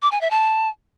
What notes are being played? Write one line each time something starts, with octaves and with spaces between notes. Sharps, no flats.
D6
G#5
E5
A5